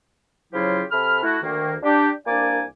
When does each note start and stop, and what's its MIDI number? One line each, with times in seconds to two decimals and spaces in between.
0.52 0.82 49
0.52 0.82 53
0.52 0.82 54
0.52 0.82 64
0.52 0.82 65
0.52 0.82 67
0.91 1.19 48
0.91 1.19 69
0.91 1.19 83
0.91 1.19 89
1.23 1.37 57
1.23 1.37 64
1.23 1.37 66
1.42 1.73 38
1.42 1.73 51
1.42 1.73 58
1.83 2.09 62
1.83 2.09 67
2.25 2.62 36
2.25 2.62 58
2.25 2.62 62
2.25 2.62 74
2.25 2.62 80
2.25 2.62 86